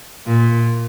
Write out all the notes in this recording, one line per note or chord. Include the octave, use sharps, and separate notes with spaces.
A#2